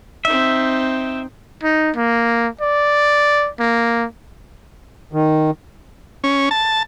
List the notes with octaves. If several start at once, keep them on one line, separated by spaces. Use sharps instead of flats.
C4 D#4 E5
D#4
A#3
D5
A#3
D#3
C#4
A5